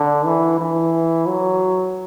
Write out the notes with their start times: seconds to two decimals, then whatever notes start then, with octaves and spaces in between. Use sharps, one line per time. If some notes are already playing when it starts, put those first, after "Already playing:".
Already playing: D3
0.25 E3
0.58 E3
1.26 F#3